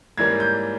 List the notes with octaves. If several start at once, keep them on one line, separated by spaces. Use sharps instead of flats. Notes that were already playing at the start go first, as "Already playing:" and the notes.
G#2 E3 G3 A#3 C#4 G#6
G6